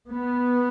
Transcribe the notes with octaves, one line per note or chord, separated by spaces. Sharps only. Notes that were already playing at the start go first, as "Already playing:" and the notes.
B3